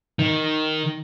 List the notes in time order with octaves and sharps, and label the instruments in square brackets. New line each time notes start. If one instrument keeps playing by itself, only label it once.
[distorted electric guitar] D#3